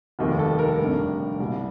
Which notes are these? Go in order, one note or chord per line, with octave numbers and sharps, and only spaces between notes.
F1 D#2 D#3 G3
A4
A#4
F1 D#2 D3 G3
C2 A#2 G3